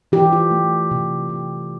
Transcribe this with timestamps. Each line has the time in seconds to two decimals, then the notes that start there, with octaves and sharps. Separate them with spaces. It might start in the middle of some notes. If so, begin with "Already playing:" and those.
0.12 E3 G4
0.32 F4
0.51 A3
0.91 C3
1.29 C3